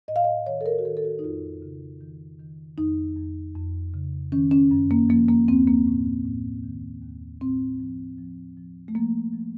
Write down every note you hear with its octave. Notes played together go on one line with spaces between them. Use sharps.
A2 D#5
F5
D#5
D#3 C#5
A4
A#4
F#4
D#3 A4
A4
F#4
D#4
F2 F4
C#3
D#3
D#3
F2 D#4
F2
F2
C#3
D#3 C#4
C#4
F#2
A#3
F3 A#3
A#3
D#2 C4
A#3
A2
A2
D#3
D#2
A2 C4
F3
F3
F3
A3
F3 A#3
F3